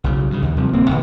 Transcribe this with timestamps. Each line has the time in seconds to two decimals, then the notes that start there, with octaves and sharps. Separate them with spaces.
0.04 B1 C#3 F#3
0.31 G2 C#3
0.42 D#2
0.57 C3 F3 G3
0.73 D1 A#3 C4
0.87 C#2 B2 D#3